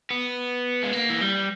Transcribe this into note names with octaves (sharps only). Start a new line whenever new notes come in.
B3
G#3
A#3
E3
G3